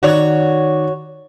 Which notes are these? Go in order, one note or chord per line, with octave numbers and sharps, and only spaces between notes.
D#3 F#4 C#5 D5